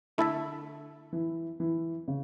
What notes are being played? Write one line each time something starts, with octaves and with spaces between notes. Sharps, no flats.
D3 A3 E4 A4 E5
E3
E3
C#3